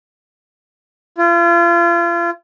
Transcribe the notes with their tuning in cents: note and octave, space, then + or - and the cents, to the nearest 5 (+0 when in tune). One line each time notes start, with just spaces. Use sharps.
F4 -35